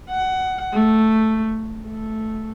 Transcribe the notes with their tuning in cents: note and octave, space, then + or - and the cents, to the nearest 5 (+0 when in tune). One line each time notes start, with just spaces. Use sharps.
F#5 +15
A3 +0
A3 -5